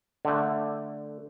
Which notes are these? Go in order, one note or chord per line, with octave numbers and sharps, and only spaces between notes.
D3 A3